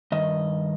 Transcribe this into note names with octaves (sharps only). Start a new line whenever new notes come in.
G2 D#3 D#5